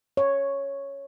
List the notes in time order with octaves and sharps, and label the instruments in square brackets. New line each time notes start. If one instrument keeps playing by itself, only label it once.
[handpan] C#5